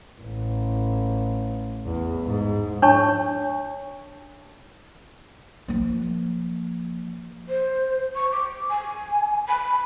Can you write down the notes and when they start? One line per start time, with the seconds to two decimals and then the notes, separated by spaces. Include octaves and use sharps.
0.20 A1
1.85 E2
2.25 G#2
2.82 D4 C#5 A5 C#6
5.68 F3 A#3
7.49 C5
8.15 C#6
8.32 D6
8.70 G#5
9.49 B5